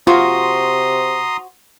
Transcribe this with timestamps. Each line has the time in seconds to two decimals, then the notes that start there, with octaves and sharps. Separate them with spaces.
0.07 C3 F4 F#4 C5 A#5 C6 D#6